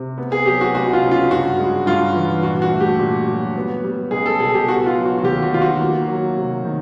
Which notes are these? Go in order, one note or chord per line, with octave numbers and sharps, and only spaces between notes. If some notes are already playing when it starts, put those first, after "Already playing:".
Already playing: C3
B3
G#4
F#3 G4
F#4
C#2 F#4
F4
C#3
F4
G2 F#4
G#3
G2 F4
E3
A#2 F#4
F#4
A3
G4
A#2
F#3
B3
G3
C#2 G#4
A4
B2 G#4
G4
B3 F#4
F4
F#3
F#4
F#4
D#2 G4
F#4
D#3 F4
F#4
A#3
F#3
C3
D#3